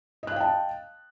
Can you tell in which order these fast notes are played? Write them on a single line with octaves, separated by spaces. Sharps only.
D#5 F#6 F5 G5 A5